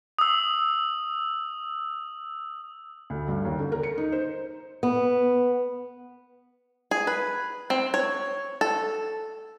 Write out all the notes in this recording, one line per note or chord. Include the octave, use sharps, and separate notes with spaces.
D#6 E6
D2
G2
D#2
D3
A#4
C#7
D#4
C5
B3
G#4
B4
C4
C#5
A4